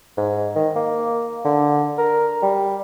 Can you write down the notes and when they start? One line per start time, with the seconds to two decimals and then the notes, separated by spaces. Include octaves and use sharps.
0.17 G#2
0.55 D#3
0.75 A#3
1.45 D3
1.98 A#4
2.42 G3